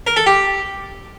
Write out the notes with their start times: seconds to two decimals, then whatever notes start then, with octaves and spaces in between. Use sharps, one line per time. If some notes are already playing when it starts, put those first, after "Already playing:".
0.07 A#4
0.16 A4
0.26 G4